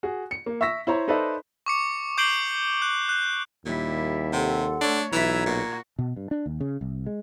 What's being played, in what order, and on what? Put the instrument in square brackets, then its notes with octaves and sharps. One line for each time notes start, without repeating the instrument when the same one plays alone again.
[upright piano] F#4 G#4
C#7
A#3
E5 C#6 E6 A#6 B6
E4 C5 C#5 A#5
D#4 A4 B4 C5 D5 E5
[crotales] C#6 D6 C#7
D6 G6 C7 D7 F#7 G7
F#6
F#6
[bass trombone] D#2 [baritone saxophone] A#2 [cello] G3 E4
[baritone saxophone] C3 [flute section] A4 F#5 C6
[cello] A3 C#5 [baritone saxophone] D4
[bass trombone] B1 [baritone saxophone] E3 [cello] F4 E5 [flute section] A#5 G#6
[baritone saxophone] A#2 [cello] F#4
[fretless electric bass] B2
G2
D4
D#2
C#3
C2
G#3